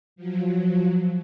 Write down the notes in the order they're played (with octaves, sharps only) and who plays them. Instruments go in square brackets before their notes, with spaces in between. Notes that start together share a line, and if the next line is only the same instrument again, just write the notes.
[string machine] F3 F#3